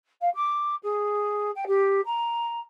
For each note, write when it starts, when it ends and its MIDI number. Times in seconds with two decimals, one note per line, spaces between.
0.21 0.29 77
0.34 0.75 86
0.83 1.50 68
1.55 1.64 79
1.67 2.00 67
2.05 2.59 82